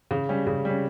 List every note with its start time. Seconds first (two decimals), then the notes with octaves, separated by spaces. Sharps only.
0.11 C#3
0.29 G3 C#4
0.47 C#3
0.65 G3 C#4